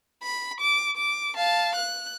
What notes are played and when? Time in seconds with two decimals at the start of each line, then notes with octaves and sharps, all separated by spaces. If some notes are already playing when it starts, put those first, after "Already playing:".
0.23 B5
0.60 D6
0.97 D6
1.35 F5 A5
1.76 F#6